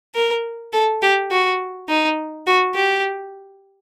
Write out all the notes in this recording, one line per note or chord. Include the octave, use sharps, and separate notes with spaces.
A#4
A4
G4
F#4
D#4
F#4
G4